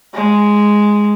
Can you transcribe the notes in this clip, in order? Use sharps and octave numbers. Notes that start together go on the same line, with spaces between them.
G#3